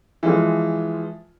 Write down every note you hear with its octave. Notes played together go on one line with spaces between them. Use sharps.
E3 F3 G#3 F4